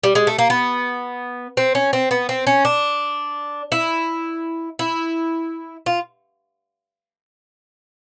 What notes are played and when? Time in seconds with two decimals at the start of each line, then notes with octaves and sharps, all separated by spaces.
0.04 G3
0.15 G#3
0.27 A3
0.38 A#3
0.50 B3
1.57 C4
1.75 C#4
1.93 C4
2.11 B3
2.29 C4
2.47 C#4
2.65 D4
3.72 E4
4.79 E4
5.86 F4